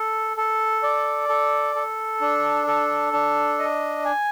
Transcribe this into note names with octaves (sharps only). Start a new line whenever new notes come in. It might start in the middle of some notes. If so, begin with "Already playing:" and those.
Already playing: A4
A4
D5
A4
A4
D4
A4
D4
D#5
G#5